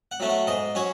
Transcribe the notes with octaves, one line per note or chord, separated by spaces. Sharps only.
F#5
F#3 A3 C#4
F#5
G#2 D#5
F#3 C#4 C#5